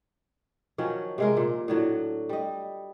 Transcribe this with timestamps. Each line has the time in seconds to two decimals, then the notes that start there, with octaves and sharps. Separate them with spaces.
0.78 D#3 F3 F#3 C#4
1.18 C3 G#3 A#4
1.37 A#2
1.68 A2 D3 F#3
2.29 G3 D#5